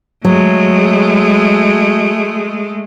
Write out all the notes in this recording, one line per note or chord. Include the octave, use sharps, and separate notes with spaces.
F#3 G#3 A3